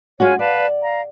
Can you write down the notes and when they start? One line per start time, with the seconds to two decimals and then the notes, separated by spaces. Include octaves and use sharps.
0.20 G#3 C#4 F4 F#4 C#5 G#5
0.39 B4 D5 F5 A5
0.82 F5 A#5